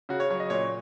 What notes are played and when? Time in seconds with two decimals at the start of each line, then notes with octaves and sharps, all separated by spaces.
0.09 C#3 F#4
0.20 C#5
0.30 F#3 C#5
0.40 D#5
0.50 A#2 C#5